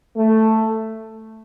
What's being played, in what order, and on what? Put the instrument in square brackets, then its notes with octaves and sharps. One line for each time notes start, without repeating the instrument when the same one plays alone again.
[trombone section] A3